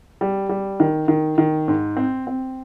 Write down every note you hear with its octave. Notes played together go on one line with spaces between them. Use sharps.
G3
G3
D#3
D#3
D#3
G#2
C4
C4